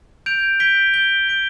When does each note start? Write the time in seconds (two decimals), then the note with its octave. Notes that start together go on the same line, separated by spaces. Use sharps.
0.26 G6 D7 F7
0.60 G6 B6 D7 G7
0.94 G6 B6 D7 G7
1.28 G6 B6 D7 G7